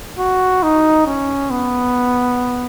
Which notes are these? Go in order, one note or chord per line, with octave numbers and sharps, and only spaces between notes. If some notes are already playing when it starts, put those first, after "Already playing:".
F#4
D#4
C#4
B3